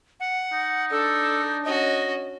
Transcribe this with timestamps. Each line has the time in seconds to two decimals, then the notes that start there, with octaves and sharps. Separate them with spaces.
0.20 F#5
0.53 D#4
0.91 D4 A4
1.65 C#4 F#4 D#5